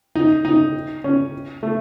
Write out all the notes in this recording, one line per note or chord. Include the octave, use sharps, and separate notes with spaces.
D#4
D#4
C#4
A3